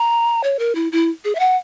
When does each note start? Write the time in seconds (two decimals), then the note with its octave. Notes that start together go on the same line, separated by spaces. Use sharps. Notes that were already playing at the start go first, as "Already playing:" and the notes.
Already playing: A#5
0.43 C#5
0.59 A#4
0.75 E4
0.92 E4
1.25 G#4
1.35 E5
1.39 F#5